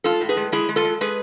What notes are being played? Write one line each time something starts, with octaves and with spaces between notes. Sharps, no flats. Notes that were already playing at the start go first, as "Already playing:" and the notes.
G#3 F4 A4
A2
G#4 B4
G#3
G#3 E4 G#4
G#3
F4 A4
G#3
G#3 G#4 B4